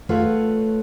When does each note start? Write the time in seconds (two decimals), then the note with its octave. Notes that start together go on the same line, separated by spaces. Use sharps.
0.09 A3 F4 B4 C#5 F#5